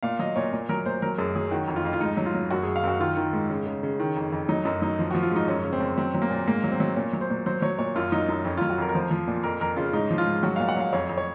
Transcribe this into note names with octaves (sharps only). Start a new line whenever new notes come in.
A#2 F5
F#3 D#5
A#2 C#5
A#2
F#3 A#4
A#2 C5
F#3 A#4
F#2 G#4
F#3 G#4
D#3 F#4
F2
F4
F2
F4
G#2 D#4
F#3
F4
F#3
F#2 F#4
F#2 G#4
F5
F#2 F#4
D#3 F4
D#3
G#2
C#3
C#3
C#3
D#3
F2
F2
F#3 D#4
F#2 D#4
F#3 D#4
F3
F3 F#4
F4
G#2 D#4
F#2 C#4
C#3
C4
F#2
F#3 C4
F#3
A#3
A#2
G#2 A#3
F#3
C4
F#3
A#2 C#4
F#3
C5
A#2
F#3 C5
F#3 C#5
A#2 C#5
F#2 F4
F#3 D#4
F#2 D#4
F2 C#4
F#3 F4
F#4
F2 A#4
A#4
F3 C5
F3
A#2
F2 A#4
F2 A#4
C#3 F4
G#2 D#4
F3
F4
G#2
F#3 F#4
A#2 F5
F#5
F#3 F5
F2 C#5
F2
C#5